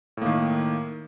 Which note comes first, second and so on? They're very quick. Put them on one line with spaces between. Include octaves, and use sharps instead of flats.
A2 A#3 D#3